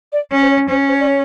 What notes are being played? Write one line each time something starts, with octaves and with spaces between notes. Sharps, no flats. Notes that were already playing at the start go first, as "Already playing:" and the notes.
D5
C#4 C#5
C5
C#5
C#4 C5
C5
D5
C#5